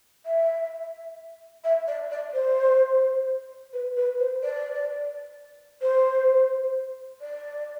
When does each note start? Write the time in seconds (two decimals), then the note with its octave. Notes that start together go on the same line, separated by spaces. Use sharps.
0.25 E5
1.64 E5
1.87 D5
2.11 D5
2.34 C5
3.73 B4
3.96 B4
4.19 C5
4.43 D5
5.81 C5
7.21 D5